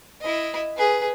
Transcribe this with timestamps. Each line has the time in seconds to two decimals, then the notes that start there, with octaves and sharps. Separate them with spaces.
0.21 E4 D#5
0.77 G#4 B4